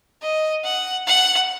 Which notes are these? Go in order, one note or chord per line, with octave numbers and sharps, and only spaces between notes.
D#5
F#5
F#5